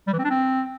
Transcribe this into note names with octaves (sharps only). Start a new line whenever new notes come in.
G3
E3
C4
D4
C4